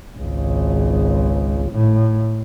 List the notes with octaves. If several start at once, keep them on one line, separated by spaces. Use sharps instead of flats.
G#1 C#2
A2